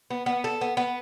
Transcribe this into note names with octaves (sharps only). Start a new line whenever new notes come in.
B3
B3
A4
B3
B3